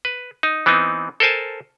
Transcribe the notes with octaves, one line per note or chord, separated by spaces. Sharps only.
B4
D#4
E3 B3 C4 D#4
A4 A#4 C5 G#5 A5